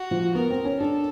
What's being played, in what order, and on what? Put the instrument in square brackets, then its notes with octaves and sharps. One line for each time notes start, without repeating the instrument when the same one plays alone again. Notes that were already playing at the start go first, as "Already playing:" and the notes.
Already playing: [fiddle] F#4
[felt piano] F3
[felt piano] B3 [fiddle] A#4
[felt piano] C4
C#4
[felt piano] D4 [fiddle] A4